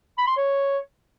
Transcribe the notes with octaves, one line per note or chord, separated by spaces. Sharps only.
B5
C6
C#5